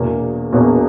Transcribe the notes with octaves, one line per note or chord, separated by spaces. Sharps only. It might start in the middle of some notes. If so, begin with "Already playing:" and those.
Already playing: E1 E2 B2 A#3
E1 E2 B2 A#3